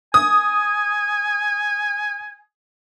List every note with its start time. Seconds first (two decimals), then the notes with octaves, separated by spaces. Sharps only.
0.14 G#5 D#6